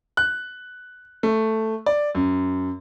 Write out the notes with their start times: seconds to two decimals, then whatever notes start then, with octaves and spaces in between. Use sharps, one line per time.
0.17 F#6
1.23 A3
1.86 D5
2.15 F#2